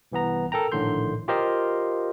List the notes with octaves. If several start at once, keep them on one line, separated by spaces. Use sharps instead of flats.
C2 E3 B3 A#5
A4 A#4 G5 A#5
A#1 A2 D3 D#3 C6 G6
F4 G4 A#4 C5 D#5 F5